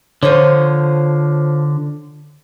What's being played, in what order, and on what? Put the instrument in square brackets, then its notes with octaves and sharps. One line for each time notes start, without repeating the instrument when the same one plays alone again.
[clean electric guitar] D3 [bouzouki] F3 C5 C#5